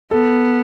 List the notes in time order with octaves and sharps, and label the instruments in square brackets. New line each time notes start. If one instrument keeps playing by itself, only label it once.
[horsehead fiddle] B3 [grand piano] A4